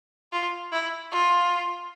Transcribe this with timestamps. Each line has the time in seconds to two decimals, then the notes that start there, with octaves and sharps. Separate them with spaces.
0.32 F4
0.72 E4
1.12 F4